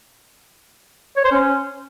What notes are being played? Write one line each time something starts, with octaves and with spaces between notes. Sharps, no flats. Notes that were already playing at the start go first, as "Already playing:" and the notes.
C#5
C5
C#4